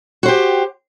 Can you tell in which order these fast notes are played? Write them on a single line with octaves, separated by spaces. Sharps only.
F#4 C5 G4